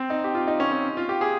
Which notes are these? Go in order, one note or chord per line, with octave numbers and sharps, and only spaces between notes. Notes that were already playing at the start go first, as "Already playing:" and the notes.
Already playing: C4
D#4
G4
F4
D#4
C#4
C4
F4
G4
G#4